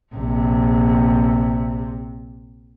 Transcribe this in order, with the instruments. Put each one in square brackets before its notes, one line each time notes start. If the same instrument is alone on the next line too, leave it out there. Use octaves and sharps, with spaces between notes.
[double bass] A#1 C3